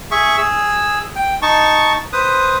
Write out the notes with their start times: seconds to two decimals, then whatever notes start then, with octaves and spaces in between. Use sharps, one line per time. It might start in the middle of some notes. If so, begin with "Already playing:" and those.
0.11 G#4 E5 C#6
0.38 G#4 E6
1.16 G5
1.42 D#4 A5 C#6
2.13 B4 C5 D#6